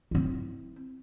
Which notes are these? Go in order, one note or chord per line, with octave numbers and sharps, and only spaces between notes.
C4 E4